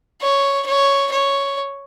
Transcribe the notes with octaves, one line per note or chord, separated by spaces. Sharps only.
C#5
C#5
C#5